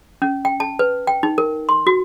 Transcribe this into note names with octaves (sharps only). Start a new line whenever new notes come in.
C#4
G5
A5
B4
G5
D#4
A#4
C6
F#4